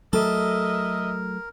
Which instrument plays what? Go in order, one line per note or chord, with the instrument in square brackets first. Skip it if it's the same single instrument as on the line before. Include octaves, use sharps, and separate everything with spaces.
[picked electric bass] F#3 A3 [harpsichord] A4 [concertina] A#4 [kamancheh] D#5 E5